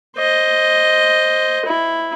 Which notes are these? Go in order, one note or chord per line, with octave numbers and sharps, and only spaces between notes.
C5 D#5
E4